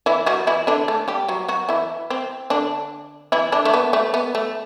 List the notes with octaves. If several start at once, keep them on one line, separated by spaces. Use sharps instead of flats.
E3 E4
F#3 F#4
E3 E4
D3 D4
A3 A4
G3 G4
F#3 F#4
F#3 F#4
E3 E4
C4
D3 D4
E3 E4
D3 D4
A3
B3
A3
B3
A3